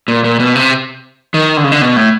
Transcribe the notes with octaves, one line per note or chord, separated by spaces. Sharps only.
A#2
A#2
B2
C3
D#3
D3
C#3
D3
B2
A2